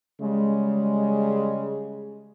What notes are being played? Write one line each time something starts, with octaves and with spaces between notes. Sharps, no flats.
C#3 G3 G#3